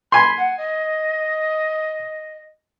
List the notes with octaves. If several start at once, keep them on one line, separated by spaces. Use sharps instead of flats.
G#5 B5 C6
F#5
D#5